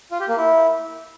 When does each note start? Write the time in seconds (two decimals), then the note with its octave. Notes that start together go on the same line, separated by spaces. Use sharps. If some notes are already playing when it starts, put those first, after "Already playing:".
0.11 F4
0.20 G4
0.29 A#3
0.37 E4